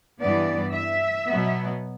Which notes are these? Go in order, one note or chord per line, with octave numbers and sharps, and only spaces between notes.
G2 E3 B3 D5
E5
B2 F#3 B3